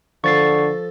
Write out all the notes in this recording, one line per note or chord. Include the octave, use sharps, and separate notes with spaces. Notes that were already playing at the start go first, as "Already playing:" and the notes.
D3 F3 A4 C#6 A6 C7